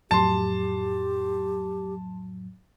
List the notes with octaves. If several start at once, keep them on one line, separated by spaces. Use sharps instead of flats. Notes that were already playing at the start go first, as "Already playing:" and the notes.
F2 A2 F#3 G4 A5 C6